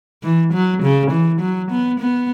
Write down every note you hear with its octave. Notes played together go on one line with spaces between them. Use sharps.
E3
F#3
C#3
E3
F#3
B3
B3